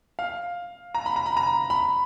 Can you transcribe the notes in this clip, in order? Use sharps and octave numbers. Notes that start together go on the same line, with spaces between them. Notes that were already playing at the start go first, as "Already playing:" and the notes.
F5
A#5
B5
A#5
B5
A#5
B5